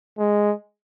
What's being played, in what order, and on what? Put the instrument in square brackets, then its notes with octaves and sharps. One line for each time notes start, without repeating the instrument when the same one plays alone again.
[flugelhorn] G#3